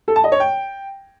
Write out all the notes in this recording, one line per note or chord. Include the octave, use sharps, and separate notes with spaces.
A4
A5
D#5
C#5
G5